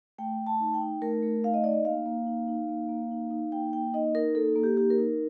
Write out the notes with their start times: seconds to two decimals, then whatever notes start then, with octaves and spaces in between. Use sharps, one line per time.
0.18 A3 G5
0.39 A3
0.47 A5
0.60 D#4
0.74 G5
0.82 D#4
1.01 A3 A#4
1.23 A3
1.44 D#4 F5
1.54 D#5
1.64 D#4 D5
1.73 D#5
1.85 A#3 F5
2.06 A#3
2.26 D#4
2.48 D#4
2.69 A#3
2.89 A#3
3.11 D#4
3.31 D#4
3.52 A#3 G5
3.73 A#3 G5
3.94 D#4 D#5
4.15 D#4 A#4
4.35 A#3 A4
4.55 A#3
4.64 G4
4.77 D#4 G4
4.90 A#4
4.98 D#4